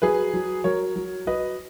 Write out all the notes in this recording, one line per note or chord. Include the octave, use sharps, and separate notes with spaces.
F#3 G#4 B4
F#3
F#3 A#4 C#5
F#3
F#3 B4 D#5